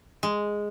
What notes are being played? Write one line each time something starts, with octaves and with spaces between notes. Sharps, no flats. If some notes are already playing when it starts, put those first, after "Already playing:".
G#3